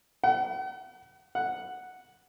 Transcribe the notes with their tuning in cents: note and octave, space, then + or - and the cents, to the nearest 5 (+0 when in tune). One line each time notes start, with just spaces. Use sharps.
F#5 +45
F#5 +0